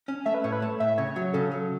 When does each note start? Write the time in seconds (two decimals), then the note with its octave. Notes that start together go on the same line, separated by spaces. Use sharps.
0.08 C#4
0.26 A3 E5
0.34 B4
0.44 A2 C#5
0.52 B4
0.62 A3
0.80 A2 E5
0.98 C#3 C#5
1.16 F#3
1.33 C#3 A4
1.52 F#3